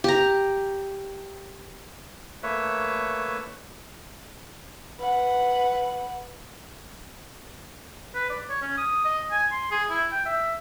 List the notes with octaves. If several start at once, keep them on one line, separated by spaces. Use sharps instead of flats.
G4 A#5
A3 A#3 B4 C#5 E5
B4 F#5
B4
D5
C#5
C#4
D#6
D#5
G#5
C6
G#4
E4
G5
E5